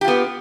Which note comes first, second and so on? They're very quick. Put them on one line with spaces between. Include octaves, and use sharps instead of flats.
G4 F4 B3